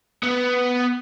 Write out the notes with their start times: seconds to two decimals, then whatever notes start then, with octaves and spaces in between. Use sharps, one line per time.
0.23 B3